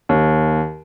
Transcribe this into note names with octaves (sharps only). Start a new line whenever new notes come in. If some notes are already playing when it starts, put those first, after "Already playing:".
D#2